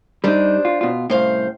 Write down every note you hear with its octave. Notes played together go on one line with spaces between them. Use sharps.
G3 D4 D#4 C5
F4
B2 F4
C2 A2 C#3 C5 F5